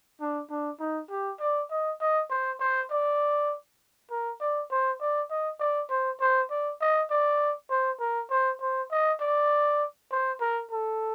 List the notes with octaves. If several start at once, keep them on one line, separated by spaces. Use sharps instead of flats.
D4
D4
D#4
G4
D5
D#5
D#5
C5
C5
D5
A#4
D5
C5
D5
D#5
D5
C5
C5
D5
D#5
D5
C5
A#4
C5
C5
D#5
D5
C5
A#4
A4